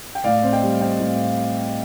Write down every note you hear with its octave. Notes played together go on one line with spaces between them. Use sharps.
G5
A2 D5 F5
C4
D#5 G5
G3
C4 D#5 G5
A2